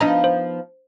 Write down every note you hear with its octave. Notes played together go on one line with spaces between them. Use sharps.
F3 B3 D4 D#4 D#5 A#5
C5